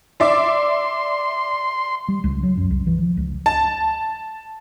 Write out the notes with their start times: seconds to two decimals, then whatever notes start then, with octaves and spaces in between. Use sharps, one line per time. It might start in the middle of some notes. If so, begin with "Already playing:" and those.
0.20 D5 E5 C6 D6
2.08 G3
2.24 C#2
2.43 F#3
2.57 F#2
2.71 C2
2.87 E3
2.99 F3
3.17 C#2
3.46 A5